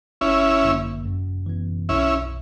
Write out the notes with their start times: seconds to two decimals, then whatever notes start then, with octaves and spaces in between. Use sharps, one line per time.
0.21 G1 C#4 E4
0.62 F#2 D3 A#3
1.05 F#2
1.46 E3 B3
1.89 B1 C#4 E4